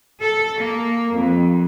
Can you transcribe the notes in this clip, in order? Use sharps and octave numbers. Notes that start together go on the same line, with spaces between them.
A4
A#3
F2